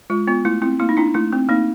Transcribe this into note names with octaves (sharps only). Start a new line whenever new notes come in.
G#3 F4
B3 F4
A3 E4
C4 E4
A#3 E4
D#4
D4 E4
A3 E4
C4
A#3 D#4